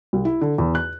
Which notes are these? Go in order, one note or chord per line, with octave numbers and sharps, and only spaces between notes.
C2
E4
D3
E2
F#6